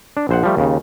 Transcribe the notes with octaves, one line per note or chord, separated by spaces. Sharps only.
D4
A#1 C5 F#5
F3 G3 A3
D#2 C#3